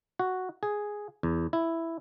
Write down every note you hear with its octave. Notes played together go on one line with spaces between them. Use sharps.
F#4
G#4
E2
E4